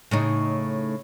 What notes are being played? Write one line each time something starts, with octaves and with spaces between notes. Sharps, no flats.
A2 C#3 D#4